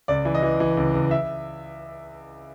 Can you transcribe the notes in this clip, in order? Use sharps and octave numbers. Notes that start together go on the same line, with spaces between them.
C#2 D5
E3
D#5
E3
E3
C#2
C#2
E5